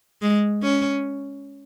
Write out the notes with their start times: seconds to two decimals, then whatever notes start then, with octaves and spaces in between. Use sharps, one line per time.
0.22 G#3
0.63 C#4